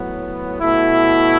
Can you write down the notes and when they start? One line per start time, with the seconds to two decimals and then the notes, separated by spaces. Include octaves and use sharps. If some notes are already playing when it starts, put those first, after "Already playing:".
Already playing: A2 F#3 B3
0.60 B2 A3 E4